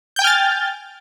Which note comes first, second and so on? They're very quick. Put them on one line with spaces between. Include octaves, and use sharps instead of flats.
G6 G5 G#5 F6 A6